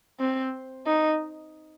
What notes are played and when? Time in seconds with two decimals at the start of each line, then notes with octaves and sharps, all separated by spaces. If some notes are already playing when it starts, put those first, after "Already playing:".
0.20 C4
0.86 D#4